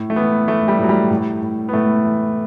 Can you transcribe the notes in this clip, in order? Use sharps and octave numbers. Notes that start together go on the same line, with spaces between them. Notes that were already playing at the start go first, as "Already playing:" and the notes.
Already playing: A2
A3
E3 B3
E3 A3
G3
A2 F#3
G3
A2
A2
B3
A2 A3
E3